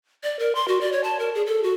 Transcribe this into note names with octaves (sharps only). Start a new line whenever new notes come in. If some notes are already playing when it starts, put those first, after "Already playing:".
D5
A#4
C6
F#4
D5
C#5
A5
A#4
G#4
A4
F#4